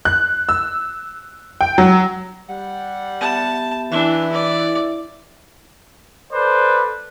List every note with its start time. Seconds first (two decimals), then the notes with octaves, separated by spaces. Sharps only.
0.05 F#6
0.49 E6
1.61 G5
1.78 F#3
2.49 G3 F#5
3.21 B3 G4 E5 A5
3.92 E3 D4 E4 E5
4.32 D5
6.32 A4 B4 C5 D5